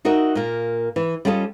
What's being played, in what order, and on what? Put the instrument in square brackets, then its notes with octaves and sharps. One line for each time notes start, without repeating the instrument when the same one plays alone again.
[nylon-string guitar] D#4 F#4 A#4 D#5 E5
A#2 A#3
E3
G3 C#4 F4 A4 D5 D#5